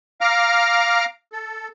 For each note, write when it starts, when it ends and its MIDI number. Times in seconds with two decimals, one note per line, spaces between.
0.21 1.05 77
0.21 1.05 82
0.21 1.05 86
0.21 1.05 89
1.33 1.68 69